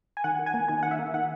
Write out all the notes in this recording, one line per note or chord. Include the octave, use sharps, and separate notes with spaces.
G#5
D#3 F#5
D#3
G#5
A#3
D#3 G#5
D#3 F#5
E5
A#3
D#3 F#5